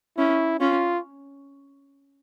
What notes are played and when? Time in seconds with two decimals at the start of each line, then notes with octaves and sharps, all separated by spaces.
0.18 C#4 E4
0.60 C#4 F4